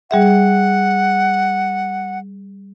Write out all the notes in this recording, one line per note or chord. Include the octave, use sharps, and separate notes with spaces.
G3 G#4 E5 F#5